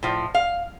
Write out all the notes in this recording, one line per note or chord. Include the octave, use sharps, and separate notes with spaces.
A2 F3
F5